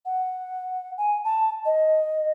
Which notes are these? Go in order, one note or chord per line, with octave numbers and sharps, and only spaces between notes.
F#5
G#5
A5
D#5